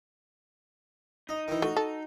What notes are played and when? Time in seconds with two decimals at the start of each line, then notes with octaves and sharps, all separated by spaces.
1.29 D#4 D#5
1.48 D#3 E3
1.62 A3 F#4
1.77 A4